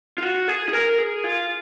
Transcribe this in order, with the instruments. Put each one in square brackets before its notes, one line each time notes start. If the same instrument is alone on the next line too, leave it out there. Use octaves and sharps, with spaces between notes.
[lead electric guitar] F4
F#4
G#4
G#4
A#4
G#4
F4